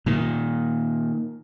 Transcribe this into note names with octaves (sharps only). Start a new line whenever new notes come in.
A#2 D#3